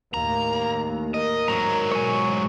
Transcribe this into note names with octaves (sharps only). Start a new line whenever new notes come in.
D#2 A2 A#3 A#5
A#4 D#5
G#2 F#3 A#5
B2 G#3 C#5 G#5